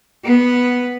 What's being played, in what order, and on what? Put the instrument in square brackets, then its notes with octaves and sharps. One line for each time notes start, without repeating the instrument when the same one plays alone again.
[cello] B3